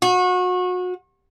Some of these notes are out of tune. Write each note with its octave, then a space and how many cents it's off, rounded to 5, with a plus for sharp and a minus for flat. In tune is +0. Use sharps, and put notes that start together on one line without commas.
F#4 -30